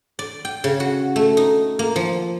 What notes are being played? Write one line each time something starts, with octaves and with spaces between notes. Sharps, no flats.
D5
G5
C#3
F#4
A3
D#4
A#3
F3